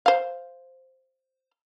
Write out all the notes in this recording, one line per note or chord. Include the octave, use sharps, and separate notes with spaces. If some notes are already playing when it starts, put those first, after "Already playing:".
C5 F5